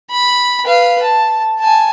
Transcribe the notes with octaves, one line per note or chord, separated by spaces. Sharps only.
B5
B4 F5
A5
G#5 A5